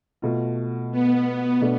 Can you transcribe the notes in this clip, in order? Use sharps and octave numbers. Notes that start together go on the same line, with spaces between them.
B2 A3 F4
B3
B2 A3 D4